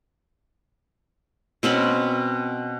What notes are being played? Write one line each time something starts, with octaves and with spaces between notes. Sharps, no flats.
B2 C4 C#4 B5